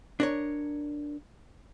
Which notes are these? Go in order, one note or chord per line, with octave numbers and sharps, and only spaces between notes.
D4 A#4 C#5